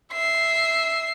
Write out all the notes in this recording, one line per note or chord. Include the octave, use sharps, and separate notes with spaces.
E5 C7